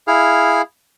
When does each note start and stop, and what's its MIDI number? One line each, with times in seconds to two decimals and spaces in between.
0.07 0.62 64
0.07 0.62 68
0.07 0.62 77
0.07 0.62 89